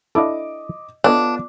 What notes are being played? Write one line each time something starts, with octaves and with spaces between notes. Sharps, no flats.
D4 E4 A4 D#5 D6
B3 D4 F4 A4 C#5 D#5